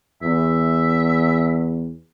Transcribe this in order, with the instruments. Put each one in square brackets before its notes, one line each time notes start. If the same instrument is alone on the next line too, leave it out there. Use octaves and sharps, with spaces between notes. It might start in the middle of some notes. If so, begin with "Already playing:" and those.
[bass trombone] E2 [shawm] E5